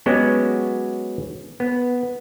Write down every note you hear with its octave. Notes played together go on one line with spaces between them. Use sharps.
F#3 G#3 B3 C#4 F#4 G4
B3